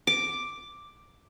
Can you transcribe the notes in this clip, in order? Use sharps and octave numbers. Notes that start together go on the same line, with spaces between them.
D6